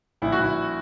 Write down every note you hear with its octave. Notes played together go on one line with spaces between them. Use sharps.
A#1 E4
F#4
A#1 E4